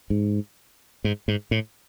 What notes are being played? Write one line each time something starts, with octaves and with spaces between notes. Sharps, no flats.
G#2
G#2
G#2
A2